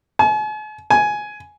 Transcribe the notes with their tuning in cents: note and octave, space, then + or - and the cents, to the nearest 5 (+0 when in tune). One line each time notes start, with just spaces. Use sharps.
G#5 +45
G#5 +10